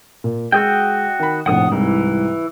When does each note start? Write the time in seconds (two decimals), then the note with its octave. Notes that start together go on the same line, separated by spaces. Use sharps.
0.24 A#2
0.52 G#3 F#4 G#4 D#5 G5 E6
1.19 D#3 B5
1.46 F1 A#1 A2 F#5 D#6
1.72 C2 G#2 E3